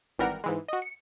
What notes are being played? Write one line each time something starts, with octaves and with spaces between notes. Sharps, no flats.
G#1 E3 G3 A#4 F#5
G#2 E3 G#3
F#4 D#5
C#7